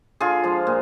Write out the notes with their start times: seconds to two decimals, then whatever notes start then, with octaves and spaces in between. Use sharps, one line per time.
0.20 D3 F4 G#4
0.44 F3 G#3
0.67 A#2